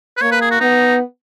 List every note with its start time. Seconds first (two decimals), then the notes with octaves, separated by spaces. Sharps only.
0.17 B4
0.22 A#3 C#5
0.32 B4
0.41 G#4
0.51 F#4
0.61 B3 D#4